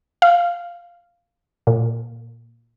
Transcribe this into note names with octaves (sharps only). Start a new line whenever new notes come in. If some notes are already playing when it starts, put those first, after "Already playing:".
F5
A#2